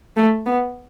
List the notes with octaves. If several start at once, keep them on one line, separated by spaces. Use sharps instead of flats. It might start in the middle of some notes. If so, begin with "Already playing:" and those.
A3
B3